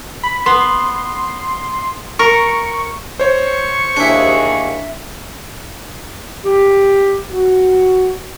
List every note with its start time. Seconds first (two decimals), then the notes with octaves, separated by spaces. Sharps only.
0.23 B5
0.46 B3 C6
2.19 A#4 C#6
3.20 C5 C#5 C#6
3.97 D#2 D4 E4 G#4
6.44 G4
7.30 F#4